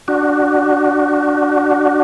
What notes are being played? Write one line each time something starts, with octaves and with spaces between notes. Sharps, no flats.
D4 F#4